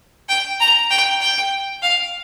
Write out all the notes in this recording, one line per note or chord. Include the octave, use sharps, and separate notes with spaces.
G5
A#5
G5
G5
F5